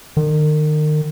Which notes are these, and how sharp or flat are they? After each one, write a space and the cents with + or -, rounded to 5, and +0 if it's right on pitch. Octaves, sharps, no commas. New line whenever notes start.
D#3 -35